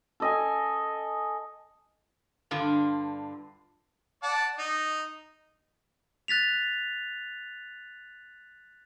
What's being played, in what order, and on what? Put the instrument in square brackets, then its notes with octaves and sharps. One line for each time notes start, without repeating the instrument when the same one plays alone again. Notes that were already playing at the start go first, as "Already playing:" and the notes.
[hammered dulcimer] A4 D#5 G#5
[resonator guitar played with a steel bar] G2 D3 F4
[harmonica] D5 F#5 A5
D#4
[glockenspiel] F#6 A6 B6 F7